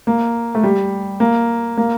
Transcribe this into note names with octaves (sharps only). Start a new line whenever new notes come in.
A#3
A3
G3
A#3
A#3